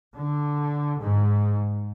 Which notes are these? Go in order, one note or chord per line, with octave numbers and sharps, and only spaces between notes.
D3
G#2